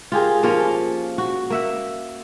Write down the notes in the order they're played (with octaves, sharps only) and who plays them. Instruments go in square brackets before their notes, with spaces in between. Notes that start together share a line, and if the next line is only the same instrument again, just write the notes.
[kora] F4 G4 G#4 A#4
F3 A#3 C#4 F4
F#4
A#3 E5 F#5